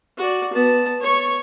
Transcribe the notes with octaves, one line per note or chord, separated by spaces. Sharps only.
F#4 D5
B3 A5
C#5 C#6